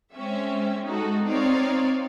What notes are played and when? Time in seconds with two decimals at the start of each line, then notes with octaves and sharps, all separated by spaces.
0.14 G#3 C4 C#4 E5
0.84 G#3 D#4 F#4 A4
1.26 C4 D#4 C#5 D5 F5